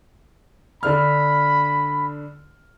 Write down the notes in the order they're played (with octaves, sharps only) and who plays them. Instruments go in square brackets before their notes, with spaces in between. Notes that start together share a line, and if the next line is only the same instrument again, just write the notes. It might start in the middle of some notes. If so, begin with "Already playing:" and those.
[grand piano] D3 D4 F6 [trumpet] B5